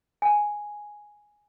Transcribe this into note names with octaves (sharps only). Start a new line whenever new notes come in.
G#5